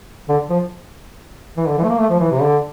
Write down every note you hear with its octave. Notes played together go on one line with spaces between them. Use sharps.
D3
F3
E3
D3
E3
A3
A#3
A3
F3
E3
C3
D3